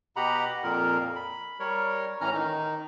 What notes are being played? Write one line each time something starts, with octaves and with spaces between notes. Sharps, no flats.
B2 G4 D#5 F#5 A#5 B5
F2 A#2 A#4
B5
G3 A#4 C#5
A2 E3 C#4 A#5 F6
D#3 D#4